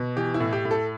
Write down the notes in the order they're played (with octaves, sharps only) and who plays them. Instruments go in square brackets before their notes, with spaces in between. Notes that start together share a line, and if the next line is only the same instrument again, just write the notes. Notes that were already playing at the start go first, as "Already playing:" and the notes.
Already playing: [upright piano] B2
E3 G4
E4
A2
G4
A2
A4